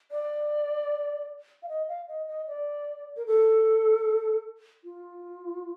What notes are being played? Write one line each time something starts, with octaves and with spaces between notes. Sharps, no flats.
D5
F5
D#5
F5
D#5
D#5
D5
A#4
A4
F4